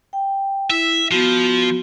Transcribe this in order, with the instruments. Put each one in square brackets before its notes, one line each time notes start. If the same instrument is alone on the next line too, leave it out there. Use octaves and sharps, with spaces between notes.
[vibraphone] G5
[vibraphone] E4 [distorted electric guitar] E5
[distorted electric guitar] F3 [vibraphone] B3 F#4